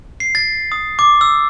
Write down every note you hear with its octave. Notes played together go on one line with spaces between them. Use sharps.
C7
A6
D#6
D6
E6